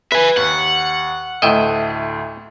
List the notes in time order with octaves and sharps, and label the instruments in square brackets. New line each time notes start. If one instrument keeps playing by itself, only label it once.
[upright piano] B4 [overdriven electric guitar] E5 G#5
[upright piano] D#2 [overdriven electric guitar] F#5
[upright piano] D2 A2 [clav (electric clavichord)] D#5 E5 G5